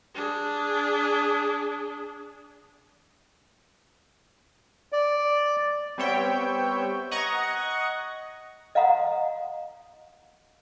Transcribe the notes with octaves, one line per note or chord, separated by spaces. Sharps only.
D4 G#4
D5
G3 B3 C4 C#5 E5 G5
D#5 F#5 A#5 C#6 G#6 A#6
D#5 F5 F#5 A#5 C6 D#6